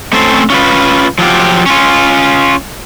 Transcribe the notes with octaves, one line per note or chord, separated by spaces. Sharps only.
A3 C4 C#4 A4 C5
C#4 F4 B4
F3 F#3 F4 G4
C#4 F4